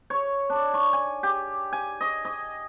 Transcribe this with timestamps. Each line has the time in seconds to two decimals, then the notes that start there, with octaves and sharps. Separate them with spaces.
0.10 C#5
0.50 D4
0.74 C#6
0.93 G#5
1.23 G4
1.73 G#5
2.01 D#5
2.25 D#5